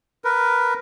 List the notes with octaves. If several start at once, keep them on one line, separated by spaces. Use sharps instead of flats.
A#4 B4